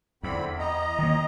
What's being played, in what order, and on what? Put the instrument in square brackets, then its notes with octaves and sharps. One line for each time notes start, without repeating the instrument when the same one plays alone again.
[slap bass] E2 [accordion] D3 C4 B5
[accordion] D#5 A#5
[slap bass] D#3 A#3